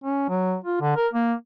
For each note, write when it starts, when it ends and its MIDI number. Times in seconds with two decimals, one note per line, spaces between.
0.04 0.26 61
0.29 0.56 54
0.64 0.81 65
0.81 0.92 50
0.96 1.07 70
1.13 1.34 58